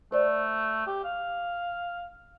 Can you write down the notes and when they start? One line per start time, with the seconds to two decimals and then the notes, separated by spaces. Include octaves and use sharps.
0.12 A3 C5 D5
0.87 G4
1.04 F5